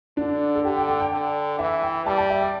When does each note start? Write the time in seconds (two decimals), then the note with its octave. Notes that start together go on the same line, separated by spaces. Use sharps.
0.17 D3 D4
0.55 A4
0.64 D3 G4
0.76 G5
0.88 G5
1.00 G5
1.12 D3
1.59 E3 E5
1.82 G5
2.06 G3 A5
2.18 A5
2.30 E5
2.41 D5